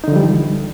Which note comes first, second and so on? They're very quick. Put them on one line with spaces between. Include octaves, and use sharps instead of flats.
D#4 D3 F3 G3 E3